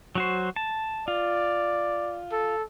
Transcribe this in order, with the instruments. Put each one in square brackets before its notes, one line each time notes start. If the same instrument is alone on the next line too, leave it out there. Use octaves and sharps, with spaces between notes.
[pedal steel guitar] F#3 F#4 C5
A5
[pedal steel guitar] F4 [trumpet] D5
[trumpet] A4